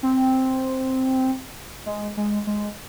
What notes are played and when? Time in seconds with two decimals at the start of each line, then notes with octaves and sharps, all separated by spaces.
0.03 C4
1.86 G#3
2.17 G#3
2.47 G#3